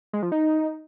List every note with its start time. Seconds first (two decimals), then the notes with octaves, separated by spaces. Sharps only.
0.13 G#3
0.23 F3
0.32 D#4